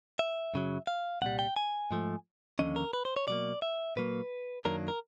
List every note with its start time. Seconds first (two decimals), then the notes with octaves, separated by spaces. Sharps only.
0.19 E5
0.54 F#2 C#3 F#3
0.87 F5
1.22 C2 A#2 G3 F#5
1.39 G5
1.56 G#5
1.91 G#2 F3 A3
2.59 D#2 D3 F3 C#4 D#5
2.76 A#4
2.93 B4
3.05 C5
3.16 C#5
3.28 B2 F#3 A#3 D5
3.62 E5
3.96 A#2 F#3 A#3 B4
4.65 F#2 D#3 F#3 A#3 D4 A#4
4.88 A#4